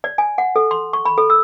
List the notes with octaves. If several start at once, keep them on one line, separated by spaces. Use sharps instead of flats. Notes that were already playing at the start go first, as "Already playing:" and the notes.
D5
G#5
F#5
A4
C6
C#6
B5
A4
E6